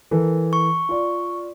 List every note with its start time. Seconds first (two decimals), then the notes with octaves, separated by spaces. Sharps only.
0.11 E3 A4 A#4
0.53 C#6
0.89 F4 D5